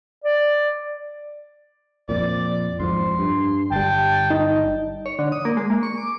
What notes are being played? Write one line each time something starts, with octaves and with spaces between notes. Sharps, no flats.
D5
F2 A#2 D5
F2 G#2 F3 C6
G2
G1 G3 G5 A5
D#4
C#5
D3
D#6
A#3
G#3
A#3
C#6
D6